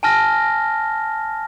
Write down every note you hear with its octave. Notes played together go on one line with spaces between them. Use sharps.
G#5 A5 F6 A#6